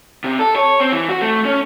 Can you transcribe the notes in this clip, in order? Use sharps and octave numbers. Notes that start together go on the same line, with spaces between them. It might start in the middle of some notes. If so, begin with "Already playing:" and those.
C3
A4
C#5
C4
E3
F#4
A3
C#4